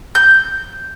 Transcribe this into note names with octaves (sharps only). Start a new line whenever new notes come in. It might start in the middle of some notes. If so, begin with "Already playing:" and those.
G6